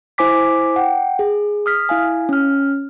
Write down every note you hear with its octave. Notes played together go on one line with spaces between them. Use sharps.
E4 C5 G#5 D6 B6
F#5 G5
G#4
D#6 F6 B6
E4 F5 G#5
C#4 F6